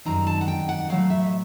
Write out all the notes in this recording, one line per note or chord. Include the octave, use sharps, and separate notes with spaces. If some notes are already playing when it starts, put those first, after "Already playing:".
F#2 D#3 G3 C4 D#4 A#5
A5
F#5
G5
F#5
A2 F#3 A3 F5
E5
D#5